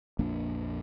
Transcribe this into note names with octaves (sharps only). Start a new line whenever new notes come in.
A#1 F2 A#3 D4